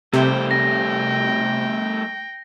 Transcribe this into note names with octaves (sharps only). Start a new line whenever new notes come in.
C3 G3 A3 C5 G5
G5 A#6